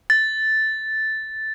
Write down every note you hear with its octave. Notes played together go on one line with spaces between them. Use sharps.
A6